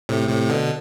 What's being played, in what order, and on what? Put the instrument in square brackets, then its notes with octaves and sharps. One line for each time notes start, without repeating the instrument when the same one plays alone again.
[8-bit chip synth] A2 C3
A2 C3
B2 D3